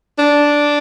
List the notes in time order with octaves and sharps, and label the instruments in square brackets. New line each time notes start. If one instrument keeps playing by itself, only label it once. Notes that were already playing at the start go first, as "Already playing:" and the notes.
[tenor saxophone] D4